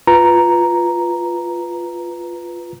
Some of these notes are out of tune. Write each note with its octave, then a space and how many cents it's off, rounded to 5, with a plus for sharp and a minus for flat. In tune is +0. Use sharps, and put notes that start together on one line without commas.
F4 +0 B4 +0 A#5 +0